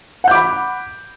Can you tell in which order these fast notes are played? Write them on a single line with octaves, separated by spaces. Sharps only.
F#5 G6 D6 B5